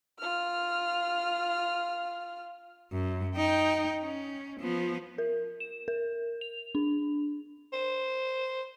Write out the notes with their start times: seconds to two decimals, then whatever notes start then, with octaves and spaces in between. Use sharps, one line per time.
0.19 F4 F6
2.92 F#2
3.36 D#4 G5
4.02 C#4
4.60 F3 B3
5.18 A#4
5.60 E7
5.88 A#4
6.41 F7
6.75 D4
7.73 C5